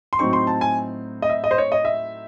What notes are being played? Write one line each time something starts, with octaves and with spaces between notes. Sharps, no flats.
C6
A2 F#3 C4 D#4 C#6
C6
A5
G#5
D#5
E5
D#5
C5
C#5
D#5
E5